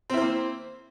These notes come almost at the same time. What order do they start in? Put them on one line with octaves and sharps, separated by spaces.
C4 E4 C5 A#3